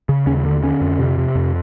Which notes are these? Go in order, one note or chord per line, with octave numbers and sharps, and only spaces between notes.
C#3
D#2 C#4
D3
D3 C#4
F2
C3
C3
F2